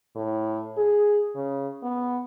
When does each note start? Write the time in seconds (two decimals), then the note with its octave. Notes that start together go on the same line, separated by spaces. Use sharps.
0.16 A2
0.77 G#4
1.35 C#3
1.82 B3